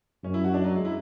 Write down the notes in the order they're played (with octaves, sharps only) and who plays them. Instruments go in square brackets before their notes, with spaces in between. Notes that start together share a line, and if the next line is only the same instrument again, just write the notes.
[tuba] F#2 [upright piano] C#4
[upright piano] E4
F#4
D4
F#3
G#3
E4